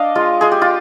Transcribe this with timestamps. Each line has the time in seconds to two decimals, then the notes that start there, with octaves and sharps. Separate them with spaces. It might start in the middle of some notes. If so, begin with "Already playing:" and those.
Already playing: D4 D#5 F5
0.15 G#3 F4
0.41 G#3 G#4
0.52 G4
0.62 F4